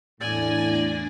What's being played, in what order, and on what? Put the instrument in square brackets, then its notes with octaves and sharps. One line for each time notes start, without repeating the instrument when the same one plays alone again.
[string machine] E2 D4 A#6 [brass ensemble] A2 [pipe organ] D5 [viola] G#5